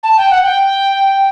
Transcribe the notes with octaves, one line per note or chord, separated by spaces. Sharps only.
A5
G5
F#5
G5